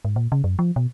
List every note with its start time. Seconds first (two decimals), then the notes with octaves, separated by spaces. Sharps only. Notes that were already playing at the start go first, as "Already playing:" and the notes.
0.05 G#2
0.16 A#2
0.32 C#3
0.44 F#2
0.59 F3
0.76 B2